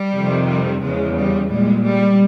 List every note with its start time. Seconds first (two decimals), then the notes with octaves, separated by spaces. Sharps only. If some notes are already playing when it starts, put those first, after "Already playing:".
Already playing: G3
0.14 F2 C3 D#3
0.48 G3
0.81 E2 C#3 F3 G#3
1.15 G3
1.49 A#2 G3 G#3
1.83 G3